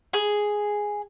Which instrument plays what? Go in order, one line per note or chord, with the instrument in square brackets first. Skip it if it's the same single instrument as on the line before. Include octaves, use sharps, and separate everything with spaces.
[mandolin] G#4